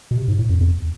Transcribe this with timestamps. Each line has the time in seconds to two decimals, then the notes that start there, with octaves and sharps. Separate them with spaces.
0.11 B2
0.17 C3
0.28 G#2
0.39 A2
0.50 F2
0.61 E2